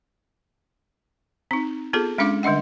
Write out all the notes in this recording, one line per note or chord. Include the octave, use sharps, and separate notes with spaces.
C4 D#4
B3 F4 G#4 A4
G#3 C#4 D4 F5 D6
D3 G3 D4 D#5 F#5